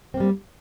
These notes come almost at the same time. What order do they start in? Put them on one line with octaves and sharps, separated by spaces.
C4 A#3 G3